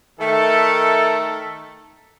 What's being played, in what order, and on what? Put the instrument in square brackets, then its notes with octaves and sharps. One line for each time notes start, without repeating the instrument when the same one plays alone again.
[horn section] D#3 A3 A4